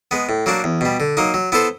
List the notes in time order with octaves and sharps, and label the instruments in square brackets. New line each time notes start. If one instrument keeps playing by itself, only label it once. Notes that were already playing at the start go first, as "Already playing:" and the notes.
[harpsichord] G#3 B3
A2
F#3 A#3 D4 F#4
E2
B2 G3
D3
F#3 A#3 D#4
F#3
B3 E4 A4 C5